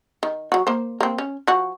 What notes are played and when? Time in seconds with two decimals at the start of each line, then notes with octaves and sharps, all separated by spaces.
0.23 D#3
0.52 F#3 F#4
0.67 A#3 C5
1.01 A#3 C4
1.18 C#4
1.47 F3 F#4